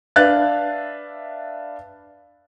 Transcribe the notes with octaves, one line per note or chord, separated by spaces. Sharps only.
D4 B4 E5 F5 F#6 A6